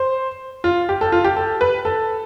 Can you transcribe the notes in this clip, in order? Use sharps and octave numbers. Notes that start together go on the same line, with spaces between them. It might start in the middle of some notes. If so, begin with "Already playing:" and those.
Already playing: C5
F4
G4
A4
F4
G4
A4
B4
A4